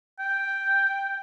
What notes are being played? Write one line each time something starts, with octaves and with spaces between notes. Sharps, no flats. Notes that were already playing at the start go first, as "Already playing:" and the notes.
G5